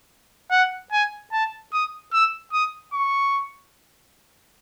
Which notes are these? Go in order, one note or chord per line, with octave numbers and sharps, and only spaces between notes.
F#5
G#5
A5
D#6
E6
D#6
C#6